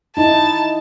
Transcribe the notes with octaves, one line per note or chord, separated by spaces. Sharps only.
D#4 E4 A5